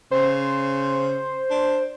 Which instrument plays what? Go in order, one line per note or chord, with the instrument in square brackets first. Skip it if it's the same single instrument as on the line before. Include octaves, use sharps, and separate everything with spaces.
[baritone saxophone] C#3 [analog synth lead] C5
[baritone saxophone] D4